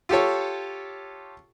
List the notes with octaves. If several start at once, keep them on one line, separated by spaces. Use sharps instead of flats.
F4 G4 A4 C#5